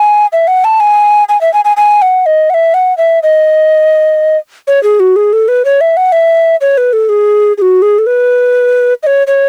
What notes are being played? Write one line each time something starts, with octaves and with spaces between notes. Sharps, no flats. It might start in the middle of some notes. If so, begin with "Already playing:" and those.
Already playing: G#5
E5
F#5
A5
G#5
G#5
E5
G#5
G#5
G#5
F#5
D#5
F#5
E5
F#5
E5
D#5
C#5
G#4
F#4
G#4
A4
B4
C#5
E5
F#5
E5
C#5
B4
A4
G#4
G#4
F#4
G#4
A4
B4
D#5
C#5
C#5